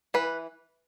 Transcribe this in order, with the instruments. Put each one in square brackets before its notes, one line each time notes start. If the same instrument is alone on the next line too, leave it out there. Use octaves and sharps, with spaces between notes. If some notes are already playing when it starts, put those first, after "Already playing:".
[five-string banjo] E3 B4